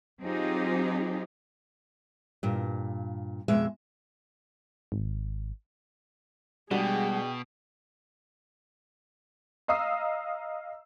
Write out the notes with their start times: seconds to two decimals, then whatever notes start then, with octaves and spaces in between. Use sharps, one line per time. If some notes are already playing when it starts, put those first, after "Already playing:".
0.21 F#3 C4 D#4 F4 G4 G#4
2.43 G2 A#2
3.48 F2 B2 G#3 E5
4.92 G#1
6.71 B2 G3 G#3 D4 F#4 G#4 G5
9.68 D#5 F5 A#5 D#6 E6 C7